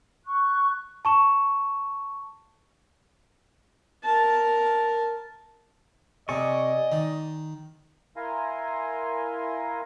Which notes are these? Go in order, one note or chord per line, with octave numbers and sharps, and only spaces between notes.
C#6 F#6
A5 C#6 E7
A#4 A5
C3 D5 D#5 G#5 C#6
D#3
E4 A#4 F5 G#5 A#5 C6